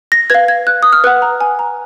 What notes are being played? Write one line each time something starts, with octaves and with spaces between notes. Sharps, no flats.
A#6
B4 F5 G#6
G#6
F#6
D#6
F6
B4 F#5 F#6
A#5
G#5
A#5